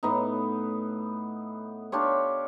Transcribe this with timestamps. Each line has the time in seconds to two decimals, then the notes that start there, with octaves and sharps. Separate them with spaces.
0.03 A2 B3 D#4
1.92 D4 F4 G4 C#5